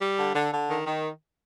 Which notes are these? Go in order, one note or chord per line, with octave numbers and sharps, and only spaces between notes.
G3
D3
D3
D3
D#3
D#3